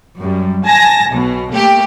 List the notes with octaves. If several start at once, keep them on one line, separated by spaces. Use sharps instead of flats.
F#2 G3
G#5 A5 A#6
B1 B2
A3 A#3 G4